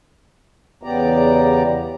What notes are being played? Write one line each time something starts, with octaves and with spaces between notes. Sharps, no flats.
E2 C#3 B3 G4 D5 A#5